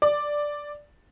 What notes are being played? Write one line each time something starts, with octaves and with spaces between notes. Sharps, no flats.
D5